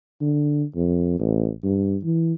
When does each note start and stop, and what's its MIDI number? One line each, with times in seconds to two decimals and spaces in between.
0.21 0.64 50
0.76 1.16 41
1.19 1.50 33
1.64 1.96 43
2.04 2.33 52